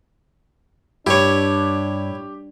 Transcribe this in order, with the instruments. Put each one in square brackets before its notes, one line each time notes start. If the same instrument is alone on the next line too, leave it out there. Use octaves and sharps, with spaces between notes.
[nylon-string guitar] G2 [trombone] D4 [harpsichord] E4 C#5 [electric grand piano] G4